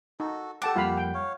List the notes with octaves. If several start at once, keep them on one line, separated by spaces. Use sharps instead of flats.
D#4 F#4 A4
G4 A4 F#5 A5 D6
F2 G3 A#3 F4 F5 B5
G5
C#5 F5